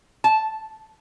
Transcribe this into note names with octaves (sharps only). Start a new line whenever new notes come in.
A5